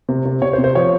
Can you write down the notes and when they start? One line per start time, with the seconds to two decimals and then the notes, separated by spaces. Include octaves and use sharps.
0.09 C3
0.25 C3
0.42 C3 C#5
0.53 C5
0.58 C3
0.64 C5
0.75 F3 C#5